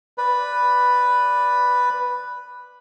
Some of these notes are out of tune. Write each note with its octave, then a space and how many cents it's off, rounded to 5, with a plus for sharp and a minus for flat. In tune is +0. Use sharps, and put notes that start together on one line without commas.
B4 +0 D5 +0